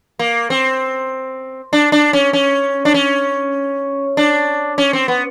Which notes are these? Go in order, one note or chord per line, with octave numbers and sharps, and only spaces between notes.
A#3
C4
D4
D4
C#4
C#4
D4
C#4
D4
C#4
C4
B3